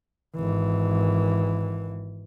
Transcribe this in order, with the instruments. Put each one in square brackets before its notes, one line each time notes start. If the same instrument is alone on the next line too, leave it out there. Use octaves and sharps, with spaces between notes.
[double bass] G#1 E3